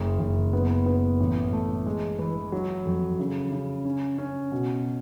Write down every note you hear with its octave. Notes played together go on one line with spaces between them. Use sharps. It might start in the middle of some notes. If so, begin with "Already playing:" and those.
Already playing: F#1
F#1
B3
B3
A1
A3
G#3
E3
F#3
F2
C#3
C#3
C#4
C#4
B2